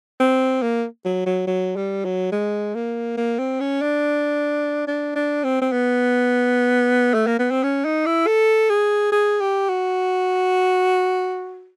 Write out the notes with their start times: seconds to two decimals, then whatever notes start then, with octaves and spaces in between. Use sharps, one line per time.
0.20 C4
0.62 A#3
1.05 F#3
1.26 F#3
1.47 F#3
1.76 G3
2.05 F#3
2.32 G#3
2.75 A#3
3.17 A#3
3.39 C4
3.60 C#4
3.81 D4
4.87 D4
5.16 D4
5.44 C4
5.62 C4
5.72 B3
7.14 A3
7.27 A#3
7.39 B3
7.51 C4
7.63 C#4
7.85 D#4
8.06 E4
8.27 A4
8.70 G#4
9.12 G#4
9.41 G4
9.69 F#4